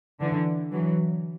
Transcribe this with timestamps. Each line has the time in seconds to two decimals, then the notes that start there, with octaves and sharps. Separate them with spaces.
0.20 D3 E3
0.72 E3 F#3